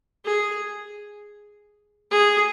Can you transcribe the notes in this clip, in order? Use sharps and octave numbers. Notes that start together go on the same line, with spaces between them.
G#4
G#4